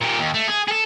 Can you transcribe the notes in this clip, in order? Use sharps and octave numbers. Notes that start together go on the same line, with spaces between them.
A#2 G4
D#2
A3
G#4
G#4 A4